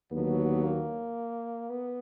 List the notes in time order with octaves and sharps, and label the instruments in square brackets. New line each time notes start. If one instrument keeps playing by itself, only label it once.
[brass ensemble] D#2 D3 F#3 [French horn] B3
[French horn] A#3
B3